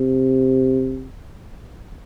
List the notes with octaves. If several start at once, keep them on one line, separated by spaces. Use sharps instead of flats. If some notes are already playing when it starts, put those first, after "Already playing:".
Already playing: C3